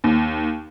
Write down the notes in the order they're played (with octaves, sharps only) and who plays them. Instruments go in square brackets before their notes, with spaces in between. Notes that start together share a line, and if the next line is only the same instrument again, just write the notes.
[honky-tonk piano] D#2